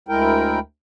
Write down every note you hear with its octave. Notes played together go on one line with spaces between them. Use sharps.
D2 G#3 E4 A#4 G5